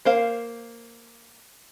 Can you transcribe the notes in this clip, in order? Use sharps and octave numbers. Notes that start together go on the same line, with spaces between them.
A#3 C5 F5